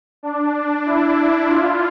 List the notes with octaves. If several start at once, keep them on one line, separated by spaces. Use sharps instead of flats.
D4
E4
F4